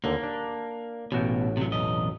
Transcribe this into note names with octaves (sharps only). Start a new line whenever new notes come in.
D#2 D3 A#3
D4
A1 B2 F#4 G5
C3 F#3
B1 E2 D#5